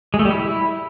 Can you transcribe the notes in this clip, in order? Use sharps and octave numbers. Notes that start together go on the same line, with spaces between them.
G#3
A3
G3
E4